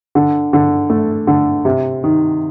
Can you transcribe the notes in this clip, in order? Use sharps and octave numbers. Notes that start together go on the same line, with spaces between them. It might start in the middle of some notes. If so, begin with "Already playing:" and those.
D3
D3
A3
D3
C3
D#3